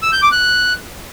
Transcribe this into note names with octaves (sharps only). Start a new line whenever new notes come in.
E6
G6
D6
F#6